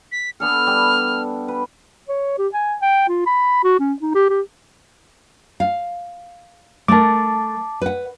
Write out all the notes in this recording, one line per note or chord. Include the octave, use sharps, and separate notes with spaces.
B6
B3 D4 A4 F6
G3
B4
C#5
G4
G#5
G5
F4
B5
F#4
C#4
D#4
G4
G4
F5
A3 A#4 A5 D6
B4 F#5